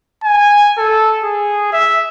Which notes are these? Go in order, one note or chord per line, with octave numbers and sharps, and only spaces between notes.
G#5
A4
G#4
E5